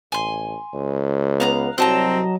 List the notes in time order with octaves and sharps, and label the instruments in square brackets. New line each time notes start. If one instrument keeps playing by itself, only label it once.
[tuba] A1 [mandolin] G#5 C6
[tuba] C#2
[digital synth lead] B3 [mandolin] F5 A#5 F#6
[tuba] C2 [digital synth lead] F#3 [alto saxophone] C4 [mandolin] D#5 A5 A#5